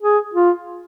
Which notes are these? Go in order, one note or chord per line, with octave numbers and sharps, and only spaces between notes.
G#4
F4